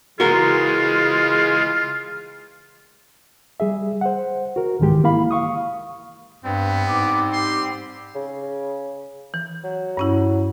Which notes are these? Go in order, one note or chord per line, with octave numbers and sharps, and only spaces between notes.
C#3 E3 G#3 F4 F#4 G#4 A#4
G3 G#4 E5
C5 F#5
F#4 A#4
C2 G#2 D#3 E3 G#3 G4
A#3 E4 F5 B5
F5 C#6 D#6
G2 G3 B3 C4
G#2 D6
G4 C6
C#3
E3
F#3
G2 C#4 E4